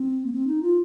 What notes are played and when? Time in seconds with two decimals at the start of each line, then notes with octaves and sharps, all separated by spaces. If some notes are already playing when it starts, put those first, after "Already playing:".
Already playing: C4
0.26 A#3
0.33 C4
0.47 D#4
0.62 F4